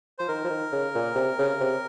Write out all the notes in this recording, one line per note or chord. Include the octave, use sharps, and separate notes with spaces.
F3 C5
D#3 A#4
F3
D#3
C#3
A#2
C3
C#3
C3